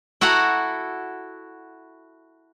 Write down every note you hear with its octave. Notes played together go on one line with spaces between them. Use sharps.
E4 F#4 A4 F#5 A#5